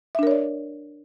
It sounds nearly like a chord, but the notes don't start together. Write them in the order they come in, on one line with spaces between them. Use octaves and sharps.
E5 D4 A#4 C#5 D5